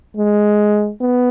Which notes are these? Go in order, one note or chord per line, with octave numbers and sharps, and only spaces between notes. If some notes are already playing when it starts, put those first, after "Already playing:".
G#3
B3